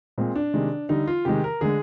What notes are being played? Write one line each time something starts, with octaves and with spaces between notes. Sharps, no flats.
A#2 G#3 C4
D4
C3 D#3 G#3
D3 G3 D#4
F4
C3 D#3 G#3 G4
A#4
D3 G#3 G#4